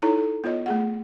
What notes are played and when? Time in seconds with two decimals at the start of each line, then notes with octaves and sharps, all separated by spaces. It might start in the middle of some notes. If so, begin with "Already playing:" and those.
0.02 D#4 E4 A4 C#5 A#5
0.17 A4
0.44 B3 F4 C#5 D#5
0.66 A3 G#4 F#5